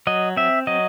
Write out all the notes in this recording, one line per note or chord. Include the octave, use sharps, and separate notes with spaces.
F#3 D#5
C4 E5
F#3 D#5